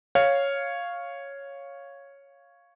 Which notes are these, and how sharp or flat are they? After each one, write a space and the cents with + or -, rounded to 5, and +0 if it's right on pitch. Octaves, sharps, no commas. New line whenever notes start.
C#5 +0 F5 +0